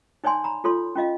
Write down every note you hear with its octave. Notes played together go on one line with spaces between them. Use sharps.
D#4 C#5 D5 G#5 C6
A#5 B5
F4 A4 C#5 C6
C#4 F4 D#5 F5